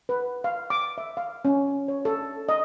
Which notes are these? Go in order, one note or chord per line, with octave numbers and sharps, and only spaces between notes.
B4
F5
D6
E5
F5
C#4
C#5
A4
D#5